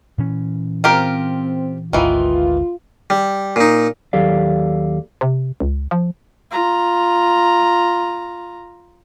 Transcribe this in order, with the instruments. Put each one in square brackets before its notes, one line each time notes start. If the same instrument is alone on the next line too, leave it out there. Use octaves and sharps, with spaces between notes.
[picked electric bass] A#2 E3 C#4
[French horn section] C4 [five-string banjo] F4 G4 A#4
[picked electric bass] G#1 D2 G#2 [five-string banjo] D#3 E3 [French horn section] F4
[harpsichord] G3
A#2 D#4
[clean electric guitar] D#2 F#3 G4 A4 D5 F5
[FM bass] C3
C#2
F3
[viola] F4 A#5